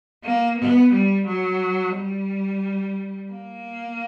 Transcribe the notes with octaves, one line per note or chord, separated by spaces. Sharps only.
A#3
B3
G3
F#3
G3
A#3